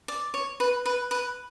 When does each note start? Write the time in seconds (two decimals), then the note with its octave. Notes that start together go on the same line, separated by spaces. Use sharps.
0.08 D5
0.34 C#5
0.60 B4
0.86 B4
1.11 B4